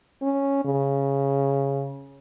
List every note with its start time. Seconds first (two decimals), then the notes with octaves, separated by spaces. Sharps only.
0.22 C#4
0.65 C#3